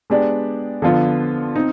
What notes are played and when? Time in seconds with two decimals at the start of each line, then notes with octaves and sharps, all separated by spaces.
0.10 G#3 B3 D4 G4 D5
0.82 D3 F3 B3 F4
1.56 C4 D#4